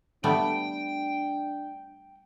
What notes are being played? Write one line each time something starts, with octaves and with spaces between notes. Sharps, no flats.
G3 A3 B3 D4 G5